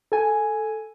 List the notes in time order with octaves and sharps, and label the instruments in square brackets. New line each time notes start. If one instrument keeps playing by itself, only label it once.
[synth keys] A4 G#5